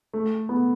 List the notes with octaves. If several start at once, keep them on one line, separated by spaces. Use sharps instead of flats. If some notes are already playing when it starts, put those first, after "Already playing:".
A3
B3